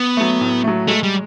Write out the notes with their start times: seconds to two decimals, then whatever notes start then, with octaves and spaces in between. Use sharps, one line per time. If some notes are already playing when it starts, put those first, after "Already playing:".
Already playing: B3
0.17 F#3 A3
0.41 A2
0.64 F#3 A3
0.88 G#3 A3
1.03 G3